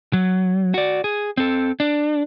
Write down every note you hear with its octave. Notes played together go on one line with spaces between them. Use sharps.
F#3
F#4 D5
G#4
C4 A4
D4